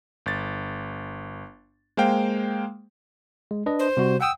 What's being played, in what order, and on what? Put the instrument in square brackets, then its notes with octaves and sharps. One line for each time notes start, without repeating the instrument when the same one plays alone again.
[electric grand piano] G1 A6
G#3 A#3 C5 F5 G5
[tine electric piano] G#3
D4 B4 D#5
[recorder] C5
[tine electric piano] C3 G3 F#4
[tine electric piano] F#5 G5 D#6 [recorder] E6